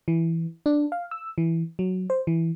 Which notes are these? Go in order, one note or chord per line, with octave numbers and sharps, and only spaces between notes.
E3
D4
F5
E6
E3
F#3
C5
E3